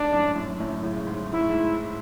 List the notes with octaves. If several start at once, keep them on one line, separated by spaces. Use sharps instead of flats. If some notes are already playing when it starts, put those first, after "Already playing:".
Already playing: G#2 D4
F#2 A2
F#2 A2
F#2 A2
A2 C#3
G#2
G#2 E4
A2
G#2